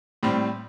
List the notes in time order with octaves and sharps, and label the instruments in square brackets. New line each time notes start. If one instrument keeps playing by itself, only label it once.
[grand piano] A2 G3 C4